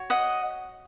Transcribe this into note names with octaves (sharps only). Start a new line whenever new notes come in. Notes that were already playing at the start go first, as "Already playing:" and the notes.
Already playing: F#4 C#5
D#5 F#5